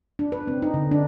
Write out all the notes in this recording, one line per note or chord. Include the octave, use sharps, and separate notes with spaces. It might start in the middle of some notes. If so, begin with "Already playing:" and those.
D4
B4
C4
D#4
D3
D4